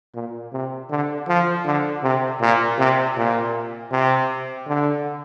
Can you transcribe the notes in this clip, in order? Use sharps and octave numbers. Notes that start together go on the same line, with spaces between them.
A#2
C3
D3
F3
D3
C3
A#2
C3
A#2
C3
D3